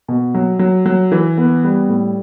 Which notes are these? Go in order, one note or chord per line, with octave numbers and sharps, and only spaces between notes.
B2
F#3
F#3
F#3
E3
B3
G3
A2